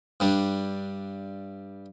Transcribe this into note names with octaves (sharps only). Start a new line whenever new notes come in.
G2 G3 D4